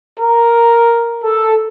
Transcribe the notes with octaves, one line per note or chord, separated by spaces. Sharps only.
A#4
A4